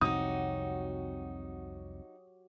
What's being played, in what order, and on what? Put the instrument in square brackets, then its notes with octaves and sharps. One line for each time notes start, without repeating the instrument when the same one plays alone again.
[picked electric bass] C2 F2 C3 [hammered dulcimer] F#3 G4 [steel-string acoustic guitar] D#4 F#4 [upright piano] D#6